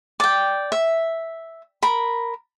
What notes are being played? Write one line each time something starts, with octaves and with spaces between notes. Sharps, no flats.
D5 G5
E5
A#4 B5